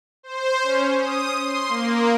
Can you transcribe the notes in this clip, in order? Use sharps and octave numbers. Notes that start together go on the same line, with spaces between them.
C5
C#4
D#6
C6
A#3